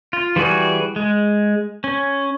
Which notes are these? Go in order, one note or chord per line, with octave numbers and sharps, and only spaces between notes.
F4
E3 G3 F#4 G#4
G#3
C#4